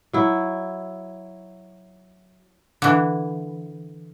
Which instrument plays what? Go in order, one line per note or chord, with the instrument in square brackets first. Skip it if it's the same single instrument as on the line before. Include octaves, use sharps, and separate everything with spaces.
[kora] F#3 E4
[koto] D3 E3